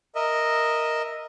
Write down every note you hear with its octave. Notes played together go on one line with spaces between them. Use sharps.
A#4 D#5 E5